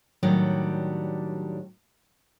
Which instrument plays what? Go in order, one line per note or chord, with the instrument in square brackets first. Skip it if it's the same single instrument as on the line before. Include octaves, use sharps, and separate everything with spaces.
[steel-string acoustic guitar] A2 D#3 F#3 G3 D4